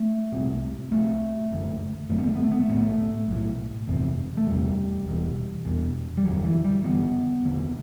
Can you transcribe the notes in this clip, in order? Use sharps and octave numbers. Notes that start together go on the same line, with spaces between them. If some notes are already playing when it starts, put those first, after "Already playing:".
Already playing: A3
C2 C3
C2 C3 A3
F#1 F#2 D3
F#1 F#2 D3 A3
B3
A3
B3
A3
B3
A3
B1 A2 B3
A3
B1 A2
F#1 E2 C3
A3
F#1 E2 C3 G3
E1 E2 B2
E1 E2 B2
G3
F#1 E2 D3 F#3
E3
G3
F#1 E2 D3 B3
E1 D2 D3